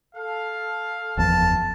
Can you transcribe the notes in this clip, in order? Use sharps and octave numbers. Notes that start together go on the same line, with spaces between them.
A4 F5
F#1 E2 F3 A5